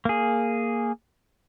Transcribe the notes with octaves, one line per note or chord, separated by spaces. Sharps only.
A#3 G#4